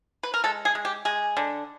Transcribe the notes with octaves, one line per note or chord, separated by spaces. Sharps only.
B4
A#4
G#3 A4
G#4
G#3
G4
G#3 G#4
D3